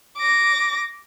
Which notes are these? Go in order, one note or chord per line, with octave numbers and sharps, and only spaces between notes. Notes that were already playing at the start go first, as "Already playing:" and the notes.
D6 A#6